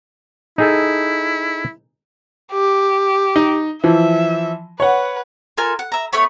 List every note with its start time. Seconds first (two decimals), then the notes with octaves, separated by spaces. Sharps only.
0.58 D#4 E4 G#4 A4
2.52 G4
3.36 D#4
3.84 E3 F3 E5
4.80 B4 C#5 F#5
5.57 F4 A4 A#4 G#5
5.79 F#5
5.92 E5 A#5
6.13 A3 B3 C#5 B5